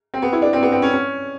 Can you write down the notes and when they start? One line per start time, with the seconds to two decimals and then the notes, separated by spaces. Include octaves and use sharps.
0.14 C4
0.22 B3
0.33 E4
0.42 D4
0.53 C4
0.63 B3
0.72 C4
0.82 C#4
0.93 C#4